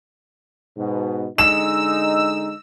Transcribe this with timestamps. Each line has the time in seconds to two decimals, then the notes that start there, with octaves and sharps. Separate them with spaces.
0.78 G#2 B2
1.38 D3 G#3 D#4 E6 E7